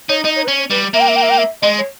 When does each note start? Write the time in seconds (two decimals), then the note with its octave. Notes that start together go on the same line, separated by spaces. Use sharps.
0.09 D#4 C#5
0.25 D#4 D#5
0.36 C#5
0.44 B4
0.47 C#4 C#5
0.59 C#5
0.70 G3 B4
0.94 A#3 E5
1.01 G5
1.08 E5
1.16 G5
1.23 E5
1.30 G5
1.38 E5
1.62 G#3 D#5
1.78 C#5